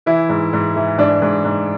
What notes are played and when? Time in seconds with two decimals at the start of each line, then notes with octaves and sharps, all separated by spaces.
0.06 E3 E4
0.29 G#2
0.53 G#2
0.76 E3
0.98 G#2 D4
1.22 G#2
1.45 G#2